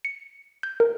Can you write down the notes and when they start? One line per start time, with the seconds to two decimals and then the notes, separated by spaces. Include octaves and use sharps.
0.05 C#7
0.63 G6
0.80 A#4